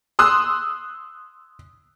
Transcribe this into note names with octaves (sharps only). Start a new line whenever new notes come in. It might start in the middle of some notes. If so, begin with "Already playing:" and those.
C6 D#6 E6 F#6